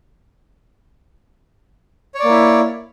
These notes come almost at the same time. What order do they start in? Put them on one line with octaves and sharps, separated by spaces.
C#5 D5 A#3 E4